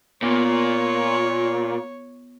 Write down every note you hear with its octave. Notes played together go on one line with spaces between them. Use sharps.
A#2 B3 F4 C#5